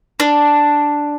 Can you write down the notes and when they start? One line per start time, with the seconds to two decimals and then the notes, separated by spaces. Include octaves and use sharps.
0.20 D4